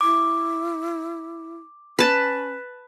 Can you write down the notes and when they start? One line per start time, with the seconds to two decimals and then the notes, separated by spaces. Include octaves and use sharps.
0.01 E4 D6
1.99 C#4 B4 A5